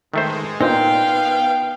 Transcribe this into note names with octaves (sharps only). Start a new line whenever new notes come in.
G#2 B2 D#3 G#3 A3 C5
A#2 B3 D#4 C5 F5 G5